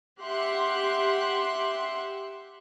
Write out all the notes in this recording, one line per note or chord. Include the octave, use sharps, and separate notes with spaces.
G4 E5 F#5 C6 F#6